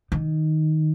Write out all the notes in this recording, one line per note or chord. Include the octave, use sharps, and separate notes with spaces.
D#3